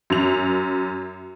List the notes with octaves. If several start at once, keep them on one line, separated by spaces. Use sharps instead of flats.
F#2 F7